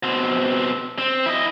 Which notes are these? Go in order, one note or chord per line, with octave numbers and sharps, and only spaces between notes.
B2 C4
C4
E4 D#5